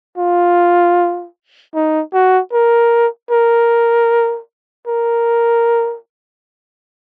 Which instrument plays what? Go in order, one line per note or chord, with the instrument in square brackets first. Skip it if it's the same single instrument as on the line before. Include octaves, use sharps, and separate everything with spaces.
[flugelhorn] F4
D#4
F#4
A#4
A#4
A#4